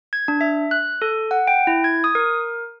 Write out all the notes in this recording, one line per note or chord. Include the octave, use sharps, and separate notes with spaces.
G#6
D4
E5
F#6
A4
F#5
G5
E4
G#6
D#6
A#4